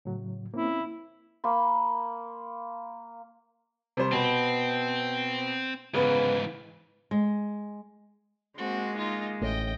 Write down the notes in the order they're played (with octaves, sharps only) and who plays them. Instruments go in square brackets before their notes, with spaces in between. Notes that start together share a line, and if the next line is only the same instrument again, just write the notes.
[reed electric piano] A2 C#3 F#3
[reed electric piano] A#3 C4 C#4 [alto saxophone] E4
[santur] A#3 B5 C6
[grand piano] C3 G3 C5
[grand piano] B2 B3 [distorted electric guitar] C4
[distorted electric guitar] G#2 E3 [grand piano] C#3 B3 B4
[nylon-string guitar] G#3
[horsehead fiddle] G#3 A#3 [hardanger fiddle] C4 F#4
[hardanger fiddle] D#4 F4
[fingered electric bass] A1 A2 [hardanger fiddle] D#5 G5